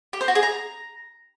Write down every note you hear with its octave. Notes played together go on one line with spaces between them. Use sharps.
G4
C5
F#4
G#4
A#5